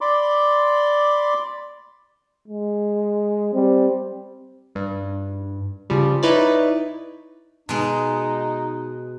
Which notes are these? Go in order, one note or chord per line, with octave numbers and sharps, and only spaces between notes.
D5 B5 C6 D6
G#3
G3 C4
G2
C#3 F3 G3
D#4 E4 B4 C#5 D5
B2 G#3 D#4